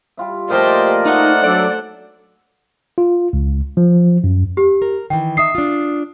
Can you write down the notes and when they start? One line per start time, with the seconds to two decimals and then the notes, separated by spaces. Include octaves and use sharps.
0.17 G3 F4 E5
0.50 A#2 F3 A3 G4 A#4 C5 D5 D#5
1.05 A3 D#4 F#4 C5 F#5
1.43 F#3 D4 A4 D5
2.98 F4
3.33 C#2
3.77 F3
4.24 F#2
4.57 G4
4.82 A#4
5.10 D#3 E3 G5
5.37 D#4 E5 D#6 C7
5.55 D4 F4